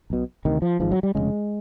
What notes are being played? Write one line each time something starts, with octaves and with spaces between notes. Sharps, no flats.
B1 B2
D2 C3 D#3
F3
G#1 G#2 F3
F#3
G3
F1 E2 C#3 G#3